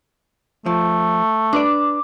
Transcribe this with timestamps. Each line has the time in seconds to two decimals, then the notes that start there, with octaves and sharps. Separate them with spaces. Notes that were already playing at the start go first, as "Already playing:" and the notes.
0.66 F3 A3
1.53 D4 B4 D5 D6